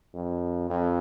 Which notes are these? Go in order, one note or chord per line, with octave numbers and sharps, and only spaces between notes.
F2
F2